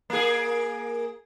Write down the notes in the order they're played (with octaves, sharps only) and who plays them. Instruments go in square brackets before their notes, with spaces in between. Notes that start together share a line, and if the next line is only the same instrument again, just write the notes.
[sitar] A#3 G#4